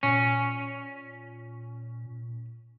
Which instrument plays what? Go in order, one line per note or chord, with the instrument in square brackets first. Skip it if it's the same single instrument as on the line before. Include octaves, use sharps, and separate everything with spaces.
[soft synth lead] A#2 [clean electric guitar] C#4